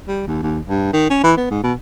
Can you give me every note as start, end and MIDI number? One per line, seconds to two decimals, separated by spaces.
0.08 0.23 55
0.27 0.42 39
0.43 0.60 39
0.68 0.88 43
0.93 1.07 51
1.10 1.21 61
1.24 1.33 52
1.37 1.47 59
1.51 1.62 44
1.63 1.74 47